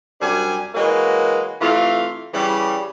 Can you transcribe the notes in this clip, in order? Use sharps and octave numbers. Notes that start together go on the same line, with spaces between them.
F#2 C3 G3 D4 G#5
E3 F#3 G#3 A#3 F#4
C3 E3 A3 F4 F5
C#3 E3 G3